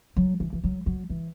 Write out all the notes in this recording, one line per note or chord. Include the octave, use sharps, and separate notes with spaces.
F#3
E3
E3
F#3
F#3
E3